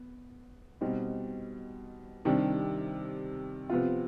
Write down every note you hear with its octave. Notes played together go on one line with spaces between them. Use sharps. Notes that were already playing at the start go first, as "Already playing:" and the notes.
Already playing: B3
B2 G3 C4 D#4
C3 D#3 G3 D4
C3 F3 B3 F4